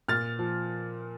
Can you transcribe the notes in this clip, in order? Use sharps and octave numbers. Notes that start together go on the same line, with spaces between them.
A#2 F6 A6
F3